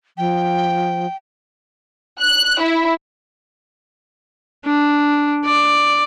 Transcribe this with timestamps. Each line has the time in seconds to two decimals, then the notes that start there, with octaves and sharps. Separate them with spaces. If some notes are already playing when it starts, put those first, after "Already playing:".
0.18 F3 G5
2.20 F#6
2.60 E4
4.66 D4
5.45 D5